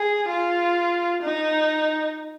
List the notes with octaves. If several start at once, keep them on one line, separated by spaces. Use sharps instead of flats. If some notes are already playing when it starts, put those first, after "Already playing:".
Already playing: G#4
F4
D#4